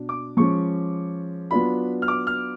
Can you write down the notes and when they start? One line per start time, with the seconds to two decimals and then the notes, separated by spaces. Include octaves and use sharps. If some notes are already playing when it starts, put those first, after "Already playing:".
Already playing: B2 D4
0.09 D6
0.37 F3 G#3 C#4 C#6
1.51 F#3 B3 D4 F4 B5
2.02 F6
2.08 D6
2.27 F6